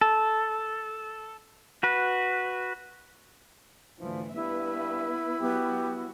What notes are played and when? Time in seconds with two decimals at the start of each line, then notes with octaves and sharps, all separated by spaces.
0.01 A4
1.83 F#4 B4
4.00 D2 G#2 E3 F3
4.35 G2 B3 E4 B4 E5
5.41 F#3 B3 F#4 G4